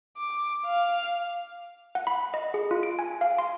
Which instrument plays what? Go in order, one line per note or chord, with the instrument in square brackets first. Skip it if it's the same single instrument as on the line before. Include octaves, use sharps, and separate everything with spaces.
[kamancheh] D6
F5
[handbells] F#5
B5
D#5
G#4
F4
D7
G#5
F5
C6